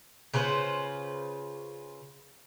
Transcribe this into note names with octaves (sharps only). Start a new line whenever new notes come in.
C#3 F4 B4 C5